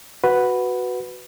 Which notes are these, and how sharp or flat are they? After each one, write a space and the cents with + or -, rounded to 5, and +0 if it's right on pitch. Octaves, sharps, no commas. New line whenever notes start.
F#4 +0 B4 +0